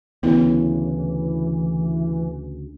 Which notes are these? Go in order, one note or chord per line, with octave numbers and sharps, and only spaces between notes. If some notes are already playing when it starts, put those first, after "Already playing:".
D2 C#3 E3 B3 E4